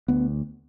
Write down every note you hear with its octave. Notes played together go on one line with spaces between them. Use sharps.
D2 B3